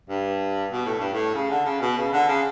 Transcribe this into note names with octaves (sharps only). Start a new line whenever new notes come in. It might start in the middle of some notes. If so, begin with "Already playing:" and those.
G2
B2
A2
G2
A2
C#3
D3
C#3
B2
C#3
D3
C#3